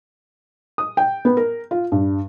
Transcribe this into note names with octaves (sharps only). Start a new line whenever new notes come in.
D#6
G5
B3
A#4
F4
G2